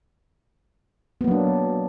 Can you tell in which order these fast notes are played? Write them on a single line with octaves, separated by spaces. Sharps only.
B3 A#3 F#3 D4